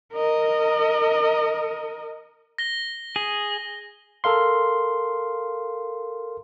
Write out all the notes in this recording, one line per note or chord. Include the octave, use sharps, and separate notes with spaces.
A#4 D#5
A#6 G7
G#4
A4 A#4 F5 C6